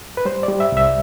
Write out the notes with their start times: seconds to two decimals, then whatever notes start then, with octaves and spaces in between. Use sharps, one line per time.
0.17 B4
0.25 G3 C5
0.43 D5
0.48 G3
0.60 E5
0.72 C2 E5